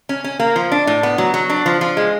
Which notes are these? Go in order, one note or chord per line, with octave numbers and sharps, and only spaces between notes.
C#4
C#4
A#3
F3
D4
A2
B3
F#3
F#3
D4
F3
F3
G#3